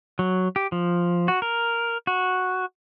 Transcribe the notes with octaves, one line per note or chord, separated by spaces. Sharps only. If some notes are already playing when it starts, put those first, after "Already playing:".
F#3
G4
F3
F#4
A#4
F#4